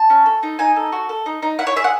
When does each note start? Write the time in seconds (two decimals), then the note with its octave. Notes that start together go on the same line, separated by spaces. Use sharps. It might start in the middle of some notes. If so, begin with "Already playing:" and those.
Already playing: A5
0.10 C#4
0.26 A4
0.43 D#4
0.59 D#4 G#5
0.76 A4
0.92 F#4
1.09 A4
1.26 D#4
1.42 D#4
1.59 E4 F#5
1.67 C#5
1.76 G#4 E5
1.84 F#5